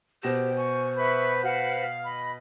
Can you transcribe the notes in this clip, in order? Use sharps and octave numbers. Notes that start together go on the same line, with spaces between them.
B2 G4 C5 A#6 E7
G#5 C#6
B4 E5 B5 C#6
F#4 B4 F5
D#5 B5